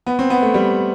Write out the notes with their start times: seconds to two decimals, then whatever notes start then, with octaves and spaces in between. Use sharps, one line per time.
0.06 B3
0.19 C4
0.30 B3
0.42 A3
0.54 G3